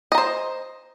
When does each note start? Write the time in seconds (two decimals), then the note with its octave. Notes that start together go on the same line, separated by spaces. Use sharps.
0.12 D#5
0.15 A#5
0.18 C5